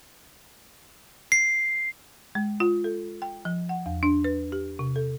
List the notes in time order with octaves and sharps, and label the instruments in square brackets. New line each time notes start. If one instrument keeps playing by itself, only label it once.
[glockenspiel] C7
[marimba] G#3
F4
A4
G5
F3
F#5
E2
D4
B4
G4
C3
A4